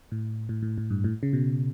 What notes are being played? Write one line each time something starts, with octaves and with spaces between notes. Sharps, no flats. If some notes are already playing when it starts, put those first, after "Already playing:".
A2
A2
A2
A2
G2
A2
C#3
B2